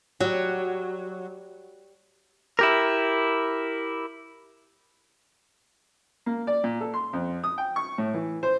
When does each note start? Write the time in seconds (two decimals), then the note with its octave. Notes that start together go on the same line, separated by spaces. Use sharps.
0.21 F#3 G3 F#4
2.59 E4 G4 A#4
6.26 A#3
6.47 D5
6.64 A#2
6.81 A4
6.94 C6
7.13 F2
7.44 D#6
7.58 G5
7.76 C#6
7.98 A2
8.14 E3
8.43 C5